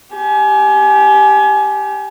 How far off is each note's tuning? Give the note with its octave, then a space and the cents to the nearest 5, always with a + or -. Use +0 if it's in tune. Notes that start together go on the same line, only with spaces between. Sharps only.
G4 +0 G#5 +30